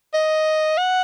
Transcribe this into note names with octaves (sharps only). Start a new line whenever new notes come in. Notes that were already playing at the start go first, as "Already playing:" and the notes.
D#5
F#5